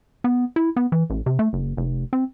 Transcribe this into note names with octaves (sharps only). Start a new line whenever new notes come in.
B3
E4
B3
E3
A1
C3
A3
F#1
F1
C4